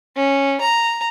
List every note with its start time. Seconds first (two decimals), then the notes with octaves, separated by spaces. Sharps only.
0.16 C#4
0.61 A#5